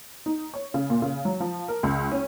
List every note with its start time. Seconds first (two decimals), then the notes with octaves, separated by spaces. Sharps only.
0.26 D#4
0.54 C#5
0.74 C#3
0.90 A#2
1.02 C#3
1.25 F#3
1.40 F3
1.68 A#4
1.83 C#2
2.12 C#4